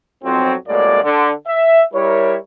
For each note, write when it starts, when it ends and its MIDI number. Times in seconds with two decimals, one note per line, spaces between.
0.24 0.54 35
0.24 0.54 41
0.24 0.54 53
0.24 0.54 54
0.24 0.54 60
0.68 1.01 36
0.68 1.01 45
0.68 1.01 54
0.68 1.01 56
0.68 1.01 58
0.68 1.01 74
1.03 1.31 50
1.47 1.82 76
1.93 2.36 55
1.93 2.36 64
1.93 2.36 70
1.93 2.36 73